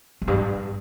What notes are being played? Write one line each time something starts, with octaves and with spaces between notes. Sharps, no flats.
F2
G2